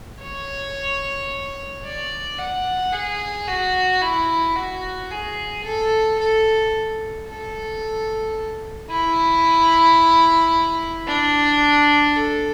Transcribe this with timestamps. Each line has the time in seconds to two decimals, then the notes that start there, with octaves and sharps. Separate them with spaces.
0.22 C#5
1.84 D5
2.39 F#5
2.93 G#4
3.48 F#4
4.02 E4
4.56 F#4
5.10 G#4
5.64 A4
6.19 A4
7.27 A4
8.90 E4
11.07 D4
12.16 A4